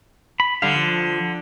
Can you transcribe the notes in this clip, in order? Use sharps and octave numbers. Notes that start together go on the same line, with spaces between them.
B5
D3 G3 F5
F3